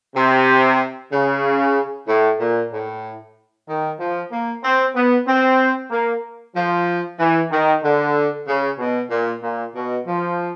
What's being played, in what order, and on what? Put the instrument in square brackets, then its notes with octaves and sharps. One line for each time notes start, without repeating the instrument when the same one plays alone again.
[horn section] C3
C#3
A2
A#2
A2
D#3
F3
A#3
C4
B3
C4
A#3
F3
E3
D#3
D3
C#3
B2
A#2
A#2
B2
F3